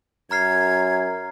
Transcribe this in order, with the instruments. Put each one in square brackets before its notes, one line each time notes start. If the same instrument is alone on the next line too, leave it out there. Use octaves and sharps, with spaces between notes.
[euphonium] F#2 [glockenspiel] A#5 F6 C7 [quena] G#6